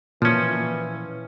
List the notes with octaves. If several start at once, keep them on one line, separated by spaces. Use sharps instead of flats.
A#2 E3 F3 C#4